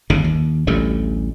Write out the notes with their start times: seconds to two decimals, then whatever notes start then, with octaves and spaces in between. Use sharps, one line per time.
0.10 G1 D#2 C#3
0.24 D#2
0.67 A1 D2 G3 A3